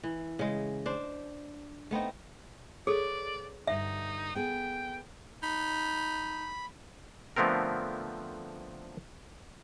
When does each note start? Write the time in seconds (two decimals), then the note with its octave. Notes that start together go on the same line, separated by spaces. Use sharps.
0.04 E3
0.39 C#3 G#3
0.86 D4 C5
1.91 A3 B3 C4 D#4
2.87 G#4 A4 B4 C#5 D5
3.67 G2 D3 D#4 E5
4.35 B3 G#4 A4 G5
5.43 D#4 B5
7.36 D3 F3 A3 B3 C4 A#4